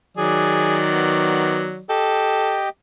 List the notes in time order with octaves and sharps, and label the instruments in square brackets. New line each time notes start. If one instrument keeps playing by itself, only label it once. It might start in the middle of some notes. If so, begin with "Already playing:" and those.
[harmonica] D#3 F#3 D5 [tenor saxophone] G#4
[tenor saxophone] B3
[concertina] G4 D#5 G5 [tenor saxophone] A4